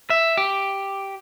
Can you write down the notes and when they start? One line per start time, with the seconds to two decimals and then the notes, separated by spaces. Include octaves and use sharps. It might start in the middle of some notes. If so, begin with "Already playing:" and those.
0.10 E5
0.37 G4